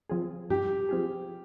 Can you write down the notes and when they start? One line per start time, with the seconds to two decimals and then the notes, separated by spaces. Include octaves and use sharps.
0.10 F3 C4 F4 G#4
0.50 G2 G4
0.89 F3 C4 F4 G#4